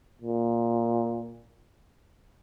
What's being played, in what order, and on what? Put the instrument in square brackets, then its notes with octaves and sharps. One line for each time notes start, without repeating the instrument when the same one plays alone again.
[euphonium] A#2